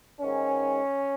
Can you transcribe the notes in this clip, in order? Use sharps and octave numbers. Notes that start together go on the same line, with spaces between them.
G#2 D#3 G#3 C#4